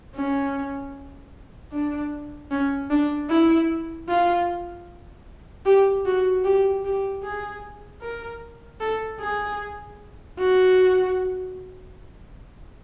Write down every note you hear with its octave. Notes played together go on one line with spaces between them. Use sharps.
C#4
D4
C#4
D4
E4
F4
G4
F#4
G4
G4
G#4
A#4
A4
G#4
F#4